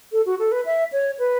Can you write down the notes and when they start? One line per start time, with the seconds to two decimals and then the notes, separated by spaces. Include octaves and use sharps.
0.12 A4
0.26 F#4
0.39 A4
0.52 B4
0.66 E5
0.92 C#5
1.19 B4